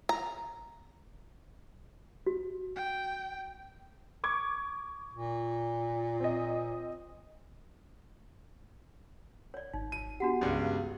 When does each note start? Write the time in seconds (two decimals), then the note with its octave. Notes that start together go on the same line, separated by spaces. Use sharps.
0.09 A#5
2.26 F#4
2.76 G5
4.24 C#6 D6 G#6
5.14 A#2
6.20 C4 D#5
9.54 C#5 D5
9.73 G#1 D#4
9.92 D#7
10.20 B3 D4 F#4 G4 F#5
10.41 C#2 G2 D#5